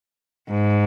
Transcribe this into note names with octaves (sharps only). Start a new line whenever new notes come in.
G#2